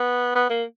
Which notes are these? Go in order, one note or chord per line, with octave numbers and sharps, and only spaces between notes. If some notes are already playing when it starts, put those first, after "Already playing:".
Already playing: B3
B3
A#3